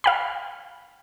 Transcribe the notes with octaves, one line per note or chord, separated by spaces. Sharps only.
F5 G5 B5